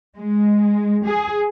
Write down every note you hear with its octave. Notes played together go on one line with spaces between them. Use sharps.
G#3
G#4